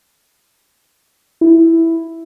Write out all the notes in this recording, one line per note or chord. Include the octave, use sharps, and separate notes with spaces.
E4